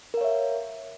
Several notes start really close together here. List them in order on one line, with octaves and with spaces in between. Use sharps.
A#4 F5 C#5 E5